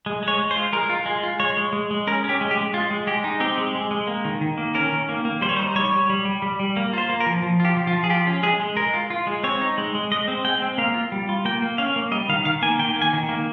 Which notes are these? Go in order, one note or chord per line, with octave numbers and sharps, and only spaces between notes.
G#3
G#3
C#5
G#3
C5
F4
G#3 A#4
F4
G#3
F4
G#3 C#5
G#3
G#3
G#3
C#4 A#4
C#4 G4
G#3
G4
G#3
G#3 F4
G#3
G#3 G4
D#4
C4 G4
G#3
G#3
G#3
A#3
D#3
D#3
A#3
C#4 A#4
D#3
A#3
A#3
G3 C5
C#5
D#4 C5
G3 C#5
G3
G3
G3
G3
G3
A#3
F4 C5
A#3
A#4
F3
F3
F4 G4
F3
F4
F3
G#4
F4 G4
C#4
G#3 G#4
G#3
G#3 A#4
F4
F4
G#3
C4 C#5
D#4
G#3
G#3
G#3 D#5
C4
G#3 G5
C4
A#3 F5
F4
G3
F4
A#3 G5
A#3
C#4 F5
A#3
G3 D#5
D#3 F5
D#3 F5
A#3 G#5
D#3 G5
A#3
G#5
D#3
A#3